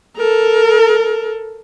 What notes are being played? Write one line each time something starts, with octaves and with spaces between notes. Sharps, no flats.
A4 A#4